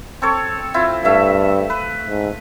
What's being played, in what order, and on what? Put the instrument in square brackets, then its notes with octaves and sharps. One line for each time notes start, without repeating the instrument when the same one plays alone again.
[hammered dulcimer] C4 A4 C#5
C4 E4 F4
[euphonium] G2 [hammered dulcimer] A3 E5 F5
[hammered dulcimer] B4
[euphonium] G#2